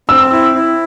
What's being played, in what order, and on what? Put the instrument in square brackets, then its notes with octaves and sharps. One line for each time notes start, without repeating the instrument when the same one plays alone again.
[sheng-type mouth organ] C4 [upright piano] E6
[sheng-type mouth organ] E4
E4